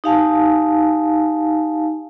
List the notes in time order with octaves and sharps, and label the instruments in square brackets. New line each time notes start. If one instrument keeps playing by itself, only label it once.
[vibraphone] D#4 G4 F5 G#5 A5